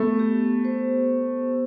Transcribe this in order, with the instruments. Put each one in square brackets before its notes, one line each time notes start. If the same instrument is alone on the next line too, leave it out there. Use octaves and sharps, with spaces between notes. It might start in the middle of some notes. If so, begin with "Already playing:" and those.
Already playing: [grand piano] A3 [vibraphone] B3
[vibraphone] G4
C5